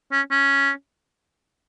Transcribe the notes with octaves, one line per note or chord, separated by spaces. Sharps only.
C#4
C#4